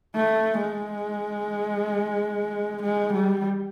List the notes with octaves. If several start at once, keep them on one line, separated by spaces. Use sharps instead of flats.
A3
G#3
G#3
G3